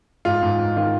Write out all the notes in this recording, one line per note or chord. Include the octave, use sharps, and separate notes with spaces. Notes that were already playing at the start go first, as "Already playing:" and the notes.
G#2 F4
G#2
G#2
D#3 F4